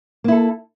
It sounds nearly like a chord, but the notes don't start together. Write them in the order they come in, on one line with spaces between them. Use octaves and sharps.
A#3 E4 A4